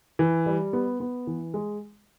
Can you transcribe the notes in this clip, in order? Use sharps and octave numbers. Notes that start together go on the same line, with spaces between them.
E3
G3
B3
B3
E3
G#3